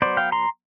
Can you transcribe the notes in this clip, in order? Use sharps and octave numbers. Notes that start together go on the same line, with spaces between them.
F#3 B3 C5 D5
F5 G5
A#5 C6